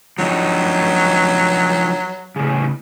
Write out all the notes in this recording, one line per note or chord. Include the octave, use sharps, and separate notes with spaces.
F3 F#3 D4 D#4
A2 C#3